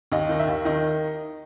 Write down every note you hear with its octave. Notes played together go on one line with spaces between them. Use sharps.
D#2 D#5
D#3
E5
D#2
D#3 D#5